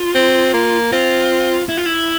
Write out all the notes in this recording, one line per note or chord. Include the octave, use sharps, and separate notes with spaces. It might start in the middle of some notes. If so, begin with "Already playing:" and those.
Already playing: F4
C4
A#3
C4 F4
E4
F4
E4